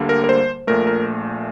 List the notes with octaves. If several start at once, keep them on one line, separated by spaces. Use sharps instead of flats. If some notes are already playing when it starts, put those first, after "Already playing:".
Already playing: D2 D3 G3 A#3
A#4
A#4
C5
A#1 A#2 A3 A#4
A#4